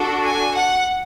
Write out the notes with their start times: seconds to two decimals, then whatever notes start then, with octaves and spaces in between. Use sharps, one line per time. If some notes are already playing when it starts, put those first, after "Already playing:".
Already playing: D4 F#4 A4
0.23 G#5
0.52 F#5